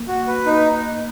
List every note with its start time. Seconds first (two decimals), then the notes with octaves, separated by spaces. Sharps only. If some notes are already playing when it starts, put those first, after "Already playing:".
Already playing: A#3
0.08 F#4
0.27 B4
0.46 D#4